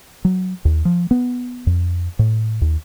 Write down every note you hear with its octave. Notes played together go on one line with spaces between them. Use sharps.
F#3
D#2
F3
B3
F2
A2
D#2